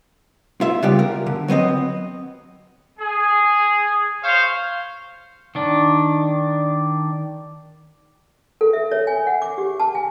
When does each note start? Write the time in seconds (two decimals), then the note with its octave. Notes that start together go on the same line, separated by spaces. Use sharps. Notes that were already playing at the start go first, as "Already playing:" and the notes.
0.61 F4 E5
0.82 C#3 G3 B3 F4 G4
0.99 A#4
1.26 D3
1.48 F#3 B3 C4 D#5
3.00 G#4
4.23 C5 C#5 F5
5.55 D#3 D4
8.61 A4
8.73 E5
8.92 C#5
9.07 G#5
9.27 F#5
9.42 D6
9.58 G4
9.80 A5
9.95 G#5